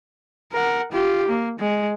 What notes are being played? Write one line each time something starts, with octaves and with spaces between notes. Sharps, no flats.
A#4 F#5
F4 G4
A#3
G#3